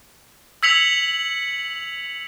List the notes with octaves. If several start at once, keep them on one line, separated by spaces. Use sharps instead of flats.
E6 G#6 B6 C#7 F7 F#7